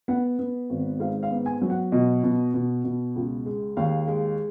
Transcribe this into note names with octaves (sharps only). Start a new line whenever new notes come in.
B3 F#5
B3
G#1
G#2 F5
F5
B3
G#5
F#3
F#5
B2 D#5
B2
B2
B2
C#2
G#3
D#2 F5
G#3